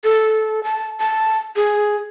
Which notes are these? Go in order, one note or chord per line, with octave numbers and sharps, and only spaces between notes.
A4
A5
A5
G#4